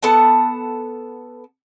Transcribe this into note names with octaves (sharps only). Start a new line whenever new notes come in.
B3 A4 F#5 A5